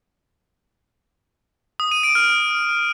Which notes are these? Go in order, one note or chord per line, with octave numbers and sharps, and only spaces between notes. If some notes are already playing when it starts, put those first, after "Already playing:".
D#6
D#7
D7
F6